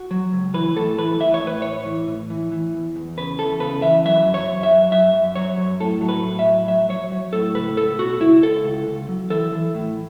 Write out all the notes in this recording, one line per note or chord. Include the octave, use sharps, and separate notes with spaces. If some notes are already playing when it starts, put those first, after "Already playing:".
Already playing: F#4
F#3
C#2
E3 B4
A2 A4
E3 B4
E3 E5
C#5
A2
B4
A2 C#5
E3
A2
E3
E3
E2
E2
C#3 B4
E2 A4
C#3 B4
E3 E5
F#3 E5
F#2
C#5
F#2
E5
F#3
F#2 E5
F#2
F#3 C#5
F#2
A2 A4
F#3
B4
A2
E5
F#3
F#3 E5
F#3 C#5
F#3
A2 A4
C#2 B4
C#2 A4
B2 F#4
C#2 E4
C#2 A4
C#2
C#2
F#3
E3 A4
E3
A2